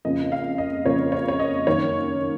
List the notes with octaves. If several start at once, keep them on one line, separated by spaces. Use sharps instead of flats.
F2 C#3 F3 A#3 D#5
F5
D#5
F2 C#3 F3 A#3 C#5
C#5
C#5
D#5
F#2 D#3 A#3 C#5